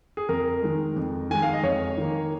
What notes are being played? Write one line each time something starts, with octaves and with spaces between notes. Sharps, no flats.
G#4
F2 A#4
D#3 G#3
F2
D#3 G#3 G#5
F5
D#5
F2 C#5
D#3 A#3